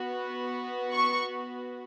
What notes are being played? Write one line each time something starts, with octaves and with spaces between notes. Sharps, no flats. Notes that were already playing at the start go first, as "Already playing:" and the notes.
Already playing: B3 F#4
C#6